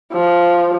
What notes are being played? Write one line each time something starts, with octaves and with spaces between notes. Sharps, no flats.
F3